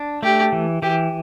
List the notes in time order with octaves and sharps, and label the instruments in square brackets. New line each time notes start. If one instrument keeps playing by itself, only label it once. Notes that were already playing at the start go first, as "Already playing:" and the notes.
Already playing: [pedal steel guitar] D4
[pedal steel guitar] A3 [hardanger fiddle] G4
[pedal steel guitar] E3
[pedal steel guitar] E3 [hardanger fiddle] G4